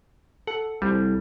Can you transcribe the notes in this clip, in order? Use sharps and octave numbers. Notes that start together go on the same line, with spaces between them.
A4 F#5
C2 G3